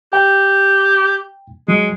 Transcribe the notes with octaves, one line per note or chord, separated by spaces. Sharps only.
G4 G5
F#3 G#3